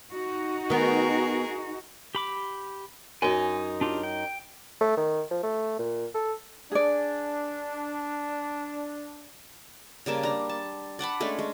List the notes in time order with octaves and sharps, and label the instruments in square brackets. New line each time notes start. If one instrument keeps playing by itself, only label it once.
[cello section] D#4 F#4
[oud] D#3 B3 [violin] G#4 A#4
[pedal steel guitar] G4 B5 D6
[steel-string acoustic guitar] F#2 D#4 [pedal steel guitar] G#5
[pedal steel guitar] D4 F4 G4
G5
[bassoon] A3
D#3
F3
A3
A#2
A4
[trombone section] D4 [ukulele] G#4 D5
[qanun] C#3 G3 A#3 A5
D4 A#5
A5
D5 F#5 A5 B5
G#3 A3 C#4 D4
G#3